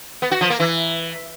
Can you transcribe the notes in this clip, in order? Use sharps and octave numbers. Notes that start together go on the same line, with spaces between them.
B3
F#4
F3
A#3
E3